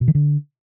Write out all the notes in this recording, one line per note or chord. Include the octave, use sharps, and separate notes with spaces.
B2
D#3
D3